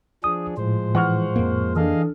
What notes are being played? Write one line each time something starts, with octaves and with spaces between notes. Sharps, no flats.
F3 D4 G#4 D#6
A2 F3 G#3 C5
E3 F#5 C#6 F6
F2 A#3
E3 D4 G#4 A4 D#5 F5